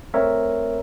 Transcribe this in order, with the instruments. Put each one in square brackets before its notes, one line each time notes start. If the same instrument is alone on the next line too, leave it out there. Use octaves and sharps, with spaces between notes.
[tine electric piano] A3 C4 A#4 C#5 E5